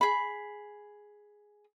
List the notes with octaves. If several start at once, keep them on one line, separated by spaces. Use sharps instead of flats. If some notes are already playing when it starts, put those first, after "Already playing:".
G#4 B5